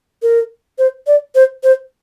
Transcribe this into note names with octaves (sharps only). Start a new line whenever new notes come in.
A#4
C5
D5
C5
C5